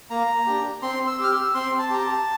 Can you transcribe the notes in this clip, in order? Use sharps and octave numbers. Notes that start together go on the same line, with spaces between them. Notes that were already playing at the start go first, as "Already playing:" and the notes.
A#3 A#5
D4 G4
C4 C6
E6
G4 F6
E6
C4 C6
A5
G4 A#5
A5